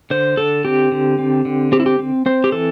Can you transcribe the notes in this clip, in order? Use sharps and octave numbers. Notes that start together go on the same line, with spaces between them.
D3 C5
D3 A4
C4 G4
D3
C4
D3
C4 G4
E4
G4
C4
C4 C5
G4
E3 A4